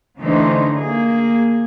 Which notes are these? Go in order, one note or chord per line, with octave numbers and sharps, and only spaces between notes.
D3 E3 A3 C#4 D#4 C5
A#3 G#4